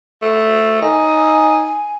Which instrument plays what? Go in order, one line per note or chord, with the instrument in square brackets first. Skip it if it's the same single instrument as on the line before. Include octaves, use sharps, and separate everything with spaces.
[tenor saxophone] A3
[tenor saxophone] D#4 [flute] G#5